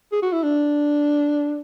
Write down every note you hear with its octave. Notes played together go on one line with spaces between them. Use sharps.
G#4
F#4
E4
D4